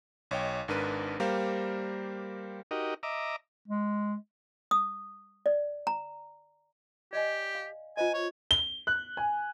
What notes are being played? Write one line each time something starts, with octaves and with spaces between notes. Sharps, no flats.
B1 C#5 D#5 G5
G#1 G#2 D4 A#4 B4 D#7
G3 A#3 G4 A#4 C5 F5
D#4 F#4 G4 A#4 D#5
D#5 E5 A#5 D6
G#3
D#6
D5
A#5
G4 D5 D#5 G#5
F5
F4 C5 D#5 G#5
C#5
G7
F#6
G#5